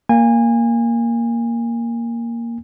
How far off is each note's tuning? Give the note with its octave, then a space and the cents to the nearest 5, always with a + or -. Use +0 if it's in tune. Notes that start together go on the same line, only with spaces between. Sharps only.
A#3 +0 G#5 -25